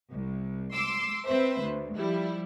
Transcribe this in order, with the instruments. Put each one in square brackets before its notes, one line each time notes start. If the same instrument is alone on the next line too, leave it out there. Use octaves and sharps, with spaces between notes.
[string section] C2
C6 D6 E6
C4 B4 C5 E5
D2
F3 G3 E4